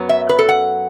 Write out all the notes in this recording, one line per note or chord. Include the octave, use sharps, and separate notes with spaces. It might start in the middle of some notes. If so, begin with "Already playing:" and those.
Already playing: F#2 F#3 B3
E5
B4
A4
F#5